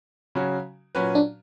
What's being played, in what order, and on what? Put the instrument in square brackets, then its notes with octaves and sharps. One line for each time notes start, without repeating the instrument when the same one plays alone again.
[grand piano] C#3 F#3 C#4 F#4
A#2 F#3 C#4 F#4 B4
[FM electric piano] D4